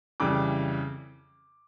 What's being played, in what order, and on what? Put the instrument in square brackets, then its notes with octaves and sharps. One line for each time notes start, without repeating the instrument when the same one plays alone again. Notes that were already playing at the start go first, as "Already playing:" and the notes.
[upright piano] F2 C#3 E3 G3 D6